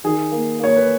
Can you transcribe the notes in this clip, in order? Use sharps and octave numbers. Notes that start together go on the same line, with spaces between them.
D#3 G#4
A#3
A#3 C#5
B4